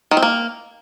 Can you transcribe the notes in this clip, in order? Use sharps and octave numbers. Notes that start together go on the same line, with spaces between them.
D#3
C4
A#3